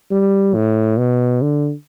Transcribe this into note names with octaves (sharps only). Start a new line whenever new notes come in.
G3
A2
B2
D3